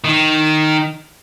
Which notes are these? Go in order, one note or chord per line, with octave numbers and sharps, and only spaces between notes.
D#3